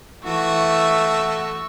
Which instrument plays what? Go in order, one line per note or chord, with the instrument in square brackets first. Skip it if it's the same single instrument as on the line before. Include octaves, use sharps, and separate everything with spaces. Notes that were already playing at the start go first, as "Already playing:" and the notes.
[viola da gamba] E3 [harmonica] A3 F#4 [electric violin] C#6 E6